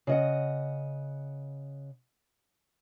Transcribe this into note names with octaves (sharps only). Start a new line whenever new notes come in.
C#3 D#5 F#5